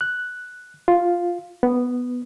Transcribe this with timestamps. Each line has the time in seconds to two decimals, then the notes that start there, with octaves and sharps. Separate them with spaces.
0.01 F#6
0.88 F4
1.63 B3